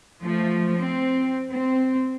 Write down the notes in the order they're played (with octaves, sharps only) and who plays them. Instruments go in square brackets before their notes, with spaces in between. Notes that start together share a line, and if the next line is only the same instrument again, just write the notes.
[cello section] F3 A3
C4
C4